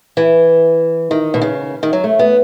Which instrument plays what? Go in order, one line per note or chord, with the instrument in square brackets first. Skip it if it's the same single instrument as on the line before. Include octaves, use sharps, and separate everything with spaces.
[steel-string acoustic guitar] E3
D#3
B2
C#3
D#3
F#3
A3
B3